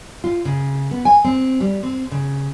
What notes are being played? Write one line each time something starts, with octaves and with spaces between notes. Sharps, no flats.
F4
C#3
B3
G#5
C4
G3
C4
C#3